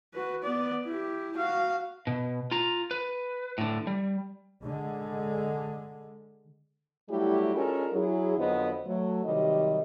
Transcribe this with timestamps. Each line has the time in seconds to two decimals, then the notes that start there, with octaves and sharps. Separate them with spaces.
0.14 F#4 B4
0.43 B3 D5
0.86 E4 G4
1.37 F#4 F5
2.07 B2
2.51 F4 A#5
2.91 B4
3.58 A2 D3
3.87 G3
4.63 D3 G#3
7.09 F#3 G3 A3 E4 F#4 G4
7.54 G#3 C#4 D4 F4 A4 A#4
7.93 F#3 E4 G#4
8.38 F2 D3 F#3 B3 C4 D#5
8.86 F#3 A3
9.24 C3 D#3 F#3 G3 G4 D#5